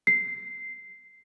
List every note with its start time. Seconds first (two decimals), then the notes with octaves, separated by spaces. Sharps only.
0.07 C7